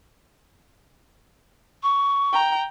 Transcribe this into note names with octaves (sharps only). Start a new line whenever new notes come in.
C#6
G5 A#5